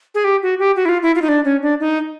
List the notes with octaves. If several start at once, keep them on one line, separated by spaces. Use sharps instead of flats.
G#4
G4
F#4
G4
F#4
E4
F4
E4
F4
D#4
D4
C#4
D4
D#4